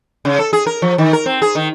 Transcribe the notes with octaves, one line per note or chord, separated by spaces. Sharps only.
C#3
A4
G#4
A#4
F3
D#3
A#4
C4
G#4
D#3